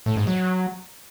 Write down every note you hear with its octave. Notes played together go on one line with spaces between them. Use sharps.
A2
G#2
F#3